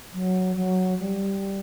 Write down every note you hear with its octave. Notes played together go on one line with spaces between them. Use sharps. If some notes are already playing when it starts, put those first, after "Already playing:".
F#3
F#3
G3